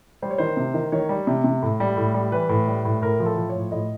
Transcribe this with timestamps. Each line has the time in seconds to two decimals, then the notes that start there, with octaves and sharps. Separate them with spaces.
0.22 G3 C5
0.30 C#5
0.38 D#3 C5
0.57 C3
0.74 D#3
0.92 D#3 C#5
1.09 G3
1.27 C3
1.44 C3
1.62 A2
1.80 G3
1.97 A2
2.14 G3
2.32 E3 B4
2.49 A2
2.67 G3
2.85 A2
3.02 A2 A#4
3.20 F3
3.26 A4
3.37 F3
3.49 C#5
3.55 A2
3.72 A2 D#5